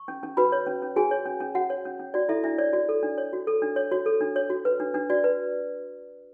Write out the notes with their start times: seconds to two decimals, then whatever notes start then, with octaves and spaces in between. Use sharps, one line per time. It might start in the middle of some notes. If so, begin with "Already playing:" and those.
Already playing: C#6
0.08 C#4
0.23 C#4
0.37 F#4 B4 B5
0.52 C#5
0.66 C#4
0.82 C#4
0.96 F#4 G#4 G#5
1.11 C#5
1.26 C#4
1.40 C#4
1.55 F#4 F#5
1.70 C#5
1.85 C#4
2.00 C#4
2.14 F#4 D5
2.29 E4 A4 E5
2.44 D4 E4 E5
2.58 C#5 D5
2.73 F#4 D5
2.89 A4
3.03 D4
3.18 C#5
3.33 F#4
3.47 A4
3.62 D4
3.76 C#5
3.92 F#4 C#5
4.06 A4
4.21 D4
4.36 C#5
4.50 F#4
4.65 B4
4.80 D4
4.94 D4
5.10 F#4 D5
5.24 B4